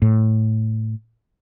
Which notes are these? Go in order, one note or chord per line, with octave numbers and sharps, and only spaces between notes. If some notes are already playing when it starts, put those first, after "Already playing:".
A2